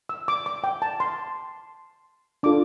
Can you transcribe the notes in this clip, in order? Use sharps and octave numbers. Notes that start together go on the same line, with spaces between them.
E6
D6
D6
G5
A5
C6
D4 F4 A4 D6